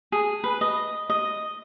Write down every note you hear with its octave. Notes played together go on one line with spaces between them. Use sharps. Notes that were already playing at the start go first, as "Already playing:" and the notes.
G#4
B4
D#5
D#5